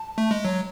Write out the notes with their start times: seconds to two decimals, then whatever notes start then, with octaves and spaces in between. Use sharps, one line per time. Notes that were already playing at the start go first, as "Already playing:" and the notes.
Already playing: A5
0.18 A3
0.31 G#3
0.45 F#3 C#5